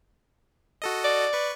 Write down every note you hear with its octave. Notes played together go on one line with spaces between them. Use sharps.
F#4 A4 D#5
D5
B4 C#6